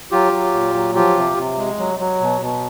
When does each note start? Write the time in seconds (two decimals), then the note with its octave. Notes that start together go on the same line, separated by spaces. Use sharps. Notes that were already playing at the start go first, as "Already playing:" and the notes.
0.12 F#3 F4 G4
0.32 F#3
0.54 A#2
0.75 F#3
0.95 F3 F4 G4
1.16 C3
1.37 C3
1.57 G#3
1.79 F#3
1.99 F#3
2.21 B2
2.41 B2